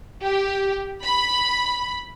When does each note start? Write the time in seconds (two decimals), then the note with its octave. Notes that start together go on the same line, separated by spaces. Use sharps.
0.23 G4
1.04 B5